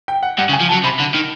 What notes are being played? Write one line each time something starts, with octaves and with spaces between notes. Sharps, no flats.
G5
F#5
G2 F#5
C#3
G#5
F3
A5
F#3
C3 B5
D3
D#3